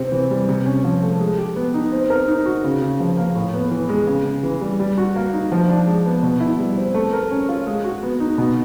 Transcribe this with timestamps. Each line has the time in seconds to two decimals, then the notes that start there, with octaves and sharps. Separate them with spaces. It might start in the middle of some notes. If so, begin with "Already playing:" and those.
Already playing: C3 C4
0.12 E3
0.31 G3
0.49 C3
0.66 C#4
0.84 F3
1.03 A3
1.20 G#3
1.38 G4
1.56 B3
1.74 D#4
1.92 C4
2.10 A#4
2.28 D#4
2.46 F#4
2.64 C#3
2.82 C#3
3.00 F3
3.17 A#3
3.35 A2
3.54 B3
3.71 E3
3.89 G#3
4.07 C#3
4.25 C#3
4.43 E3
4.61 G3
4.80 G3
4.98 F#4
5.16 A#3
5.33 D#4
5.52 F3
5.69 D4
5.87 G#3
6.05 B3
6.23 B2
6.40 E4
6.59 G3
6.77 C4
6.94 A3
7.13 A#4
7.31 C#4
7.49 F4
7.67 G#3
7.84 F#4
8.03 B3
8.20 D#4
8.38 B2